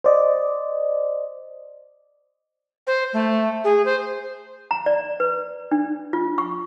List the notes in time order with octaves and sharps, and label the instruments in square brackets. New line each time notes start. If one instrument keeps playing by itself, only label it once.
[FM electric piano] C5 D5 D#5
[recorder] C5
A3
G#4
C5
[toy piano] A#5
D5
B4
D4
F4
C#6